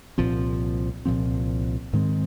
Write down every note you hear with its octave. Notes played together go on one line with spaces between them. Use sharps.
C2 A#2 F3 C4
C2 A#2 F3 C4
G#2 D#3 G#3 C4